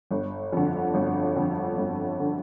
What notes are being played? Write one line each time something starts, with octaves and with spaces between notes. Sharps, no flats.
G1
F2 D3
G1
F2 D3
G1
D3